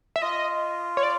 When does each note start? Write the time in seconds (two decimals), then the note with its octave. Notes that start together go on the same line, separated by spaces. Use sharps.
0.16 E5
0.22 F4 D#5
0.97 C#5
1.03 D5